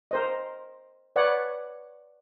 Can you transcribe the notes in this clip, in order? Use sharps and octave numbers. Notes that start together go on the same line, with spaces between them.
A#4 C5 D#5
B4 C#5 D5 F#5